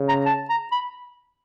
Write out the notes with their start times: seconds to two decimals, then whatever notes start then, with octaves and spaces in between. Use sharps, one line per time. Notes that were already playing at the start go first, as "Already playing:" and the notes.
Already playing: C#3
0.09 A#5
0.26 A5
0.50 A#5
0.72 B5